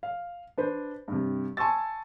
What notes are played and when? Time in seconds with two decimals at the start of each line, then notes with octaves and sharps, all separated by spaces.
0.03 F5
0.58 D4 B4 C5
1.08 G2 C3
1.57 G#5 A5 C6 C#6 E6 A6